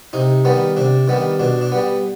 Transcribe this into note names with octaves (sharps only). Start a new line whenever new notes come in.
C3 D#4
D#3 G3 B3
C3 D4
D#3 G3 B3
B2 D4
D4
G3 B3